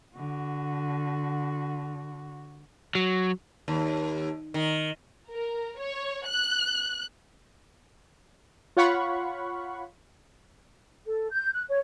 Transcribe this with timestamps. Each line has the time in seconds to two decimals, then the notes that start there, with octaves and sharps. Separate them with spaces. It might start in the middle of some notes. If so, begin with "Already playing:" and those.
0.16 D3 F#4
2.95 F#3
3.68 D#2
4.54 D#3
5.31 A#4
5.78 C#5
6.28 F#6
8.77 F4 C#5 F5 F#5 B5 C#6
11.05 A4
11.30 G6
11.53 F#6
11.69 C#5